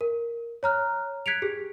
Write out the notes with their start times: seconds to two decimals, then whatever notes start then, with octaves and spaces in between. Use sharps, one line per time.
0.01 A#4
0.63 C#5 A#5 F6 F#6
1.26 F#6 G#6 B6 C#7 D7 F7
1.42 G4 G#4